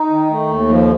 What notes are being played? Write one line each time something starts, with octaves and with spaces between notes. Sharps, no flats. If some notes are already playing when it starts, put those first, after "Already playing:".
Already playing: D#4
D#3
A3
D#2
F3